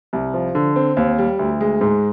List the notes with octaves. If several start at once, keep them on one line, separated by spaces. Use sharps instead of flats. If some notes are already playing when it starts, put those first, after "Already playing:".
C2
F3
D3
C4
D#2
G3
D2
G#3
G#2